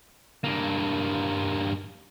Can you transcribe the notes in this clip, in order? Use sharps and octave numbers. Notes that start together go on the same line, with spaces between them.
G2 A#3